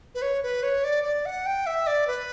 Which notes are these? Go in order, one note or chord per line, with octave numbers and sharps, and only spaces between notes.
B4
C#5
B4
C#5
D5
D5
F#5
G5
E5
D5
B4